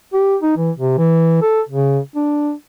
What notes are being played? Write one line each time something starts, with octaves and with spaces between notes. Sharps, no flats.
G4
D#4
E3
C3
E3
A4
C#3
D4